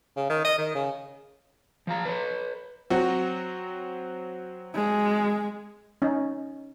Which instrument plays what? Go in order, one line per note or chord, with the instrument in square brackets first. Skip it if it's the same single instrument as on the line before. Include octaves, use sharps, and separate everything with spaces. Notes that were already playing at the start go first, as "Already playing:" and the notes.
[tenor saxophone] C#3
D#3
D#5
D#3
C#3
[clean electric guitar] F3 F5 A#5
B4 C#5
[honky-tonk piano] F#3 C4 [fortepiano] F#4
[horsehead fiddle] G#3
[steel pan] C#4 D#4